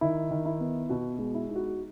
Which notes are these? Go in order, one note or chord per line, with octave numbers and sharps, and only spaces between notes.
D#3 E4
D#3
E4
B3
B2 F#4
G#3
E4
D#4
F#4